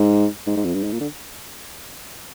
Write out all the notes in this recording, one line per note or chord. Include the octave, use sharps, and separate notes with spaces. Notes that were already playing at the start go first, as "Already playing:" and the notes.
Already playing: G#2
G#2
G#2
F2
G2
G#2
A#2
D3